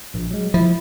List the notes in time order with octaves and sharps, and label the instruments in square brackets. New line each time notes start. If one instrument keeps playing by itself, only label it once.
[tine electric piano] A#1
F#3 G#3
[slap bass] F3 [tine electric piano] E4